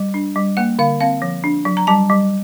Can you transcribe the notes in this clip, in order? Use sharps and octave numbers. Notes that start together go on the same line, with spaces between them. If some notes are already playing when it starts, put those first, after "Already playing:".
Already playing: G3
D4
G3
A#3 F#5
D3 F5
C4 F5
F3
D4
F#3
A#5
G3 A5
G3